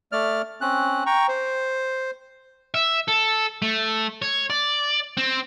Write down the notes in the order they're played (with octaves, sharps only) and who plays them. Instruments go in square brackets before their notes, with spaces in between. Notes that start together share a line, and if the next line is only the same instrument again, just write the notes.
[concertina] A3 D5 F6
C4 C#4 F#6
G5 A#5 C#6
C5
[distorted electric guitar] E5
A4
A3
C#5
D5
C4